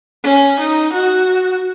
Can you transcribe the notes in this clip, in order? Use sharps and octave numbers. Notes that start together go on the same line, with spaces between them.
C#4
D#4
F#4